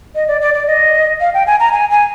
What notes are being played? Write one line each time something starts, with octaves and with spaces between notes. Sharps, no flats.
D#5
D5
D5
D5
D#5
F5
G5
G#5
A#5
G#5
G#5